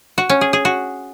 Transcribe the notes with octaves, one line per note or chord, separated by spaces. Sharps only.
F#4
C#4
G#4
G#4
F#4